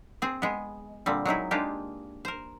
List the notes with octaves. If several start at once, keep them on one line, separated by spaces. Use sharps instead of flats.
C4 G#4
G#3 B3
A#2 D3 G3 C4
F#3 G#3 D#4 E4
G#3 A#3 D4 D#4 F4 G4
A#4 C5